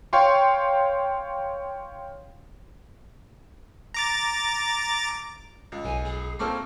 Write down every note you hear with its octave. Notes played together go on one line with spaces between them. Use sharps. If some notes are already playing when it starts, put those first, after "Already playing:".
C#5 F5 G5 C6 C#6
A#5 D6 A6
C#2
B1 G#5
G#4
A3 A#3 C4 A5 C#6 D6 F6